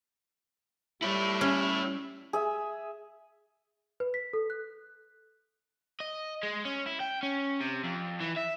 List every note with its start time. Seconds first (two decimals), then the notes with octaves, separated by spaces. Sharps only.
1.02 G3 E4 C#5
1.41 C#4
2.33 G#4 E5
4.00 B4
4.14 B6
4.33 A4
4.50 F#6
6.00 D#5
6.43 G#3
6.65 C#4
6.86 E4
7.00 G5
7.23 C#4
7.61 C3
7.84 F2
8.21 E3
8.37 E5